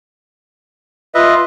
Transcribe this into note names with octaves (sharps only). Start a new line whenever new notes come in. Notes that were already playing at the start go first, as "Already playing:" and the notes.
F4 B4 D#5 E5